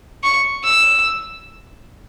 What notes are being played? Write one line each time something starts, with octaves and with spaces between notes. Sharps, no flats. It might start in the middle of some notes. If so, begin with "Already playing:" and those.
C#6
E6